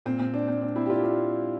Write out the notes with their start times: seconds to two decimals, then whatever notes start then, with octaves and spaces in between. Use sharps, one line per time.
0.06 A#2 C4
0.19 C4
0.34 D4
0.48 C4
0.62 D4
0.76 C4 E4
0.86 G4
0.90 D4 F4
1.04 D4 F4